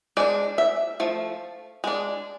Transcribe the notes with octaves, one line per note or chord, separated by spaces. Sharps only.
G#3 D4 D5
E5
F3 A3
G#3 D4